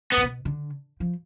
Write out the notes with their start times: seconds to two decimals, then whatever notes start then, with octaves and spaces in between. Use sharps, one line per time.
0.12 B3
0.17 G#2
0.23 B2
0.45 D3
1.00 F3